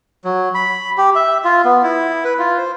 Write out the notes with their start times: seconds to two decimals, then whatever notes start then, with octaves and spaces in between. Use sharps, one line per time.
0.25 F#3
0.55 B5
0.98 G4
1.15 E5
1.45 F4
1.65 B3
1.83 E4
2.25 B4
2.39 F4
2.58 C5